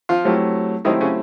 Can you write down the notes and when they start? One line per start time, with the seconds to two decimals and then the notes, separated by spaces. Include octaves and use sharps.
0.09 F3 F4
0.25 F#3 A3 C4 E4 G4
0.85 D#3 F#3 A3 C4 D#4 E4 G4
1.01 C#3 C#4